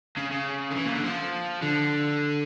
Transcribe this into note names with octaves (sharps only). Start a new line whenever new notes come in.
C#3
C#3
D3
E3
A#2
D3
F3
D3